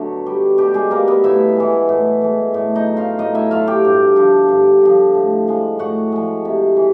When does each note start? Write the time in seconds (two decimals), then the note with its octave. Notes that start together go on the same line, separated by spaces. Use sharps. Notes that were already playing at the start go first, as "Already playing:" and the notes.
Already playing: B2 D3 F#3 A3 A4
0.26 G3
0.58 B2 G3 G4
0.74 G#3 G#4
0.91 G3 A#3 A#4
1.08 B3 B4
1.24 A2 E4 E5
1.57 E3 G#3
1.89 A2
2.21 E3 G#3
2.54 A2
2.76 D#4 D#5
2.86 F#3
2.97 F4 F5
3.19 A2 D#4 D#5
3.35 E4 E5
3.51 F#3 F4 F5
3.67 G4 G5
3.85 G2
4.16 D3 F3
4.49 G2
4.81 D3 F3
5.14 A2
5.47 F3 G#3
5.79 A2 F#4 F#5
6.12 F3 G#3
6.45 C3
6.77 E3